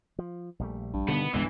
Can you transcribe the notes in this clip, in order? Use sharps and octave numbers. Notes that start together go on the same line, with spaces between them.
F3
A#1 G3 A3
A#1 G2
B2 D3 D#3 B3
G1 C2 G2 E3 G#3